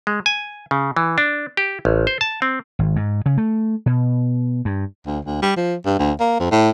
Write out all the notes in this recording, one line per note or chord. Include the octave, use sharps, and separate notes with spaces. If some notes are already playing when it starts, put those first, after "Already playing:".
G#3
G#5
C#3
E3
D4
G4
A1
C5
A5
C4
G#1
G#2
C#3
A3
B2
G2
D2
D2
G3
F3
G2
D2
A#3
F2
A2